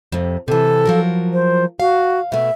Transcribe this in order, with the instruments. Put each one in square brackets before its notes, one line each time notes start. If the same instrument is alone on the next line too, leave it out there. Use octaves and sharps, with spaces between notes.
[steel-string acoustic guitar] F2 C3
[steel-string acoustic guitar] C3 E3 [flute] A4
[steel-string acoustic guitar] F3 F#3 A#4
[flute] C5
[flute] F#4 [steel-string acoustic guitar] F5
[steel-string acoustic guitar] B2 A3 [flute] E5